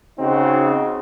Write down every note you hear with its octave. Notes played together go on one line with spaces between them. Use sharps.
C#3 C4 D#4 F#4